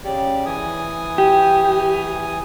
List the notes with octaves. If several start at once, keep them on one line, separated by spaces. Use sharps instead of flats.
C#3 G4 D5
E3 G#5 D#6
G4